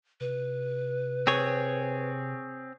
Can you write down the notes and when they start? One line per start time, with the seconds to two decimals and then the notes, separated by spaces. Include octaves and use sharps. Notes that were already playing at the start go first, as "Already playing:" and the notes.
0.21 C3 B4
1.27 C4 G#4 C#5